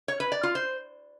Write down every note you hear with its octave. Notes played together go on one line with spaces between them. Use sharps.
C#5
B4
D5
F4
C5